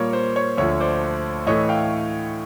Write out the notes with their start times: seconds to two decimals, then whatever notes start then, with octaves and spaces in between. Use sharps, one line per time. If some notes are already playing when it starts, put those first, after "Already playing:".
Already playing: A#2 G3 A#3 C#5
0.13 C5
0.36 C#5
0.57 D2 D3 F3 C#5
0.80 C5 D5
1.47 A2 E3 A3 C#5 D#5
1.69 F5 G5